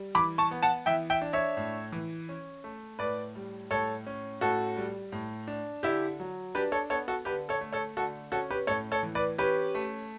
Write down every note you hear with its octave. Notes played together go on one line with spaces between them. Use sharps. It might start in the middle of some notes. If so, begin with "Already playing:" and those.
Already playing: G3
E3 B5 D6
A5 C#6
B3
F#5 A5
E3 E5 G5
E5 G5
D4
C#5 E5
A2
E3
C#4
A3
A2 B4 D5
G3
A2 A4 C#5
C#4
A2 F#4 A4
G3
A2
D4
D3 E4 G4
F#3
D4 G4 B4
A4 C#5
B3 A4 C#5
F#4 A4
D3 G4 B4
A4 C#5
A3
A4 C#5
D3 F#4 A4
C#4 F#4 A4
G4 B4
A2 A4 C#5
A4 C#5
E3
B4 D5
C#4 G4 B4
A3